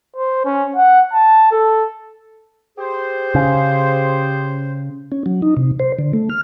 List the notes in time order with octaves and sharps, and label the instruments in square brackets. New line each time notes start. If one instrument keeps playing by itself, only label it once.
[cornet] C5
C#4
F#5
A5
A4
[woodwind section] G4 G#4 C5
[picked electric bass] C#3
[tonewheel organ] C#4
F#3
D#4
C3
C5
D3
A3
F6